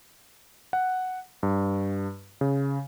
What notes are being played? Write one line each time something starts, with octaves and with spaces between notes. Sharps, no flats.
F#5
G2
C#3